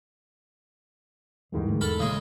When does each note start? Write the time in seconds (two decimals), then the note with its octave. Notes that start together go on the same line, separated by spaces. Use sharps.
1.52 D#2 G#2 D#3 E3 G3 G#3
1.69 D2
1.81 E2 A4 B5 F6
2.00 A1 A#2 C#3 G#3